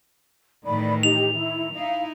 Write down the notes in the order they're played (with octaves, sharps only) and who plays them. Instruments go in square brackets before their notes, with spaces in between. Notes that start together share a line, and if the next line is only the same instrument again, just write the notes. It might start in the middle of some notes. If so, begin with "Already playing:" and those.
[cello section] A2 D#3 E3 [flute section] D5 B5
[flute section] D#4 G4 [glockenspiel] F7
[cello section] D#3 [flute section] E4
[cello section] D#4 E4 [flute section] F5